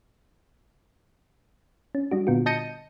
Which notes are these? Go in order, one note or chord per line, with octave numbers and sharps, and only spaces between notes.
C#4
G3 D4 F#4
A#2 D3 B3 F4 F#4
D#5 A5 G6 A#6 C#7 D#7